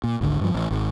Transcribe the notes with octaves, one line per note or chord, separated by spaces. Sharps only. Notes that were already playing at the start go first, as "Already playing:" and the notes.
A#2
G#1 D2 D3
G2 F3
A1
G#1